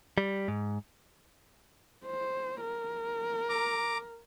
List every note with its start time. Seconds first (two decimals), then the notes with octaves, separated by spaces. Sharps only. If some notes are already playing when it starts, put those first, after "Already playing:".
0.18 G3
0.48 G#2
2.06 C5
2.61 A#4
3.49 A#5 D6